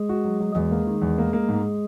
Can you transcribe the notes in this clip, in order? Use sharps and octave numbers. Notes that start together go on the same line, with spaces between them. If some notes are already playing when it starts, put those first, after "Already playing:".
Already playing: G#3 G#4
F#4
F#3
F#3
E2 G#3 G#4
A#3
D#3
E2
A#3
A#3
G#2